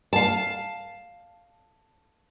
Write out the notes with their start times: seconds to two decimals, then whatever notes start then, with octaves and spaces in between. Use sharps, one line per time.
0.13 F5 A5